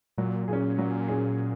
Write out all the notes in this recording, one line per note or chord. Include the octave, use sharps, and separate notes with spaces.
A#2 F#3
A#2 C#4 G#4
F#3
C#4 G#4